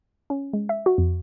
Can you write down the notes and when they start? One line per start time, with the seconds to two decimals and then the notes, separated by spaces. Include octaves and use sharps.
0.30 C#4
0.53 G#3
0.69 E5
0.86 F#4
0.98 F2